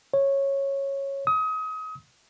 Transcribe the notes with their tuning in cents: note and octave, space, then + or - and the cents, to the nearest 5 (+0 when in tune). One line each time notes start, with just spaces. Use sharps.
C#5 -10
D#6 +30